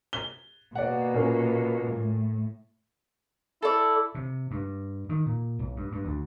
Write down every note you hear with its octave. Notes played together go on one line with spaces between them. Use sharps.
G7
B2 A#3 D5 F#5
A#2 C#4
A2
E4 A4 D5
C3
G2
D#3
A#2
B1
G2
G2
D2